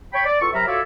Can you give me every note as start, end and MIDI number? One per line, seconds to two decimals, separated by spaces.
0.13 0.22 73
0.13 0.22 79
0.13 0.22 83
0.26 0.39 74
0.41 0.50 40
0.41 0.50 65
0.41 0.50 69
0.41 0.50 85
0.54 0.66 48
0.54 0.66 54
0.54 0.66 70
0.54 0.66 76
0.54 0.66 82
0.54 0.66 83
0.67 0.80 65
0.67 0.80 66
0.67 0.80 69
0.67 0.80 73
0.67 0.80 74
0.67 0.80 76